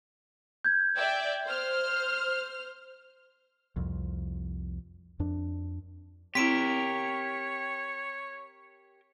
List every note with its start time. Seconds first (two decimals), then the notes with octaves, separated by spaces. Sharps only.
0.65 G6 G#6
0.96 D5 E5 G5
1.45 C5 F6
3.76 C2 F2
5.20 F2 D4
6.35 C4 E4 G4 A#4 C#5 B6 D7 E7